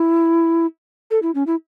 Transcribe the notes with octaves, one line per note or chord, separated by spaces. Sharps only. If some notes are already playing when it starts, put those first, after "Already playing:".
Already playing: E4
A4
E4
C#4
E4